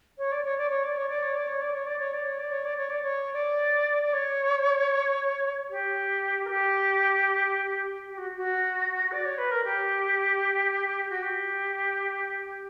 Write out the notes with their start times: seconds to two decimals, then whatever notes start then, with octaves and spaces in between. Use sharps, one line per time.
0.18 C#5
0.32 D5
0.44 C#5
0.58 D5
0.70 C#5
0.84 D5
0.97 C#5
1.09 D5
1.23 C#5
1.35 D5
1.47 C#5
1.61 D5
1.74 C#5
1.86 D5
1.99 C#5
2.13 D5
2.25 C#5
2.39 D5
2.52 C#5
2.65 D5
2.77 C#5
2.90 D5
3.03 C#5
3.34 D5
4.03 D5
4.13 C#5
5.70 G4
6.45 A#4
6.50 G4
8.08 G4
8.18 F#4
8.37 F#4
9.12 D5
9.25 C#5
9.38 B4
9.51 A#4
9.64 G4
11.10 F#4
11.22 G4